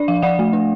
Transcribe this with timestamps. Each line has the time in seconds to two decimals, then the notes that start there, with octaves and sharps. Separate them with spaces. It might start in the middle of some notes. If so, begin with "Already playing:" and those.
Already playing: D4 D5
0.08 F3 F5
0.22 F3 D5 F#5
0.39 A3
0.53 D4